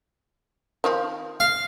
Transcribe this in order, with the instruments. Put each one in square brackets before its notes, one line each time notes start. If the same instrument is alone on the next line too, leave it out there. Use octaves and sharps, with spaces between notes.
[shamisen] D#3 F3 C4
[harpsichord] F5